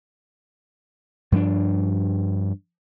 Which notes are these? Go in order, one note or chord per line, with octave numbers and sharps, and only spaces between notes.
G2 F3 C4 D4